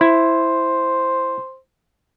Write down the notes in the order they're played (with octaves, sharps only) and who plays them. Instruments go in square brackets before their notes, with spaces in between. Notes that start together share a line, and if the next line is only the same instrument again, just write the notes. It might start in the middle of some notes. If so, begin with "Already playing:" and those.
[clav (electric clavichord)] E4 [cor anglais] C5